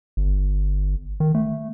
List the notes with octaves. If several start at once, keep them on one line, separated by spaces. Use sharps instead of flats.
G1
D#3
A3